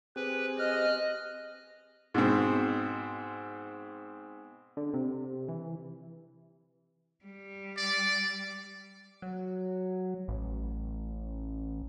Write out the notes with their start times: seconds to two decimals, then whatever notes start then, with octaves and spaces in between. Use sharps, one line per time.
0.16 C4 G4 G#4 B4
0.59 D#5 F6 F#6
2.14 G#2 B2 C4
4.77 D3
4.94 C3
5.49 E3
7.25 G3
7.77 D5
9.22 F#3
10.28 A1